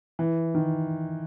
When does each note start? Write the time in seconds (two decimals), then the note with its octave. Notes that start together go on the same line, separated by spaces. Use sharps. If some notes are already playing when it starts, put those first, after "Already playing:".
0.19 E3
0.55 D#3